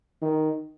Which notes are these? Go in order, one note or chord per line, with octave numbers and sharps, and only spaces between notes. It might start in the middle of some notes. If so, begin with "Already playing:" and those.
D#3